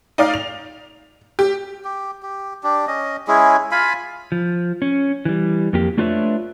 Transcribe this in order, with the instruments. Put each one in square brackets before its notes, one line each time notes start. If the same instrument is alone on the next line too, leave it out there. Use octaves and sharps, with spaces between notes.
[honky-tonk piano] D#4 D5 F5
F7
G4
[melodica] G4
G4
D4 G4
C#4 D#5
G#3 C#4 E4 G#4
F4 F5 G#5 B5
[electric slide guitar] F3
C#4
E3 G3
F2 A#3 G4
A3 D4 F4 B4 C#5 E5